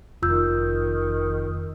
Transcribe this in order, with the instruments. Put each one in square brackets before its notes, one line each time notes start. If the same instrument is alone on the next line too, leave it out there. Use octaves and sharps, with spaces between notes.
[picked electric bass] F1 [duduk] D#3 [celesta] F4 E6 G6